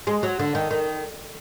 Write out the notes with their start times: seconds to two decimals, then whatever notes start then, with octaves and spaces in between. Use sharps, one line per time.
0.07 G#3
0.23 F#3
0.39 D3
0.55 D#3
0.71 D#3